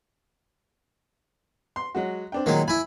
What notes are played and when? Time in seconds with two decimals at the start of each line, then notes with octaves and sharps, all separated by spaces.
1.76 C6
1.95 F#3 G#3 F#4
2.32 C4 D4 G5
2.46 A#2 D#3 F#3 G#3
2.68 E4 G#5 B5